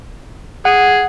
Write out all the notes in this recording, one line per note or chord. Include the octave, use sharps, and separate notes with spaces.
G#4 F#5